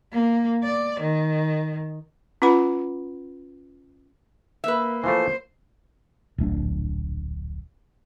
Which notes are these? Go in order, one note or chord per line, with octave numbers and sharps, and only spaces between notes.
A#3
D5
D#3
C#4 F4 B4 F#5 B5
A#3 B4 E5
E3 F3 A3 C5
D1 A#1 A3 D4